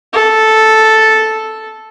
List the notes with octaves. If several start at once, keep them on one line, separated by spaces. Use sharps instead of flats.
A4